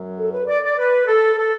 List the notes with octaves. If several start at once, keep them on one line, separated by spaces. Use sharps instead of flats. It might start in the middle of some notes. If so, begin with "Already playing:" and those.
Already playing: F#2 F#3
A4
B4
D5
D5
B4
A4
A4